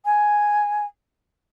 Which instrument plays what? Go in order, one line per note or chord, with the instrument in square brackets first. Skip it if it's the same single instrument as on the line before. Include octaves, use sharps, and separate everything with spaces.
[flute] G#5